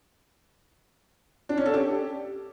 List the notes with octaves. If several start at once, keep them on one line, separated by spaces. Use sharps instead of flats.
D4
C#4
A4
G4